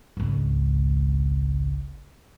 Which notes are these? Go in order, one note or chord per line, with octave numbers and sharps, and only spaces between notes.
G#1 C#2